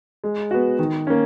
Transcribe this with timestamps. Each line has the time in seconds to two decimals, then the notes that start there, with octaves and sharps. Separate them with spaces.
0.24 G#3
0.51 B3 F#4
0.79 D#3
1.07 A#3 C#4